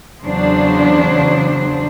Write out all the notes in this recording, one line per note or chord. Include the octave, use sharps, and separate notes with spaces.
E2 C#3 F#3 D4 C5